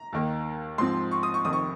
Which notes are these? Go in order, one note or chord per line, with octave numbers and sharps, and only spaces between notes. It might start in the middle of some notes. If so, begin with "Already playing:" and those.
Already playing: A#5
D#2 D#3 A#3
G#2 F3 C4 C6
C#6
D#6
C#6
F1 F2 D#3 D#6
C#6